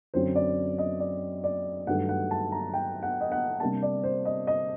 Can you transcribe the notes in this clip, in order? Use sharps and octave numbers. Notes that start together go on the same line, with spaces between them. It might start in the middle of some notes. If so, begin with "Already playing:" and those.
F#2 D3 F#3 C4 C5
D5
D#5
D5
D5
G2 D#3 F#3 A3 F#5
F#5
A5
A#5
G5
F#5
D#5
F#5
C3 G3 A#3 D4 A5
D5
C5
D#5
D#5